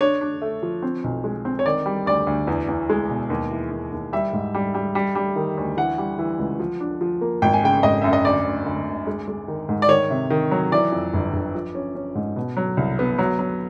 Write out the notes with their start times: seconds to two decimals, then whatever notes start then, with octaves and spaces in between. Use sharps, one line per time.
0.01 D4 C#5
0.21 D4
0.42 A3
0.63 F3
0.83 C4
1.04 B1
1.24 G#3
1.45 C4
1.59 C#5
1.65 D#3 D5
1.86 G3
2.06 D2 D5
2.27 D2
2.47 E2
2.69 E2
2.90 G#3
3.10 B2
3.30 D#2
3.51 E3
3.71 D#2
3.92 D#2
4.13 G3 E5
4.33 G#2
4.54 G3
4.74 G3
4.95 G3
5.15 G3
5.36 D#3
5.57 D2
5.77 E3 F#5
5.98 G3
6.19 E3
6.39 C#2
6.60 F3
6.80 D4
7.01 F3
7.21 A#3
7.42 G#1 G5
7.53 G#5
7.63 C#3 G5
7.83 G#1 D#5
8.02 F#2 E5
8.13 D#5
8.25 D2 D5
8.45 D2
8.66 D2
8.86 D2
9.07 G#3
9.28 G#3
9.48 D#3
9.69 G#2
9.82 D5
9.89 D#3 C#5
10.10 C3
10.30 D#3
10.51 F#3
10.72 E3 D5
10.92 F2
11.14 G1
11.34 G1
11.55 F3
11.75 C#4
11.95 C#4
12.15 G#2
12.36 B2
12.57 F#3
12.77 C2
12.99 B3
13.19 F#3
13.39 F#3